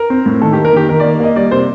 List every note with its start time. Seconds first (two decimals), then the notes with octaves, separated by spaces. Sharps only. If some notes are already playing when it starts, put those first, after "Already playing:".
Already playing: A#4
0.10 C4
0.26 A2
0.42 D#3 A4
0.53 G4
0.57 A#3
0.65 A#4
0.73 D#3 G4
0.89 D#3 A#4
1.00 D5
1.04 A#3
1.20 A#3 D#5
1.36 G3 D5
1.51 C3 C5